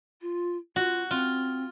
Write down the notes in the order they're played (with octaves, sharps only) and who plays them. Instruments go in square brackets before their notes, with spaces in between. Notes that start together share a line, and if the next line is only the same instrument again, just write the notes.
[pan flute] F4
[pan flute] F4 [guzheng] F#4
[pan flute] C4 [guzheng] F4